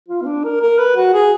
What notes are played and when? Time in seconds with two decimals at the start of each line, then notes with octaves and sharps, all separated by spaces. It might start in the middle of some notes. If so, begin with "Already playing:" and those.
0.08 F4
0.21 B3
0.26 D4
0.44 A#4
0.61 A#4
0.78 B4
0.96 F#4
1.13 G#4